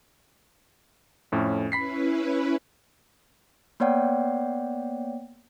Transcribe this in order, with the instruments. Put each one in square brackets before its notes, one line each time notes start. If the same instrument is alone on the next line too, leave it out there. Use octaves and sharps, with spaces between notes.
[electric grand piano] F2 A2 C#4
[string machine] C#4 E4 B4 [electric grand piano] B5 B6 C7
[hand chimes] A#3 B3 C#5 D5 F#5 G5